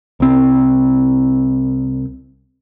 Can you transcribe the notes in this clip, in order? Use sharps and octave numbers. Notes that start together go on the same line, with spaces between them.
C2 C4